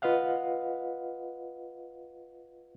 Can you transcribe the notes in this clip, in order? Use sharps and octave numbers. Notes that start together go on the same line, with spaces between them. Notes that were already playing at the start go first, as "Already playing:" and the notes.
F4 B4 D#5 F5 F#5